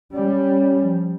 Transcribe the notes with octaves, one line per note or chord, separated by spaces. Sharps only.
G3 C#4 D5
F3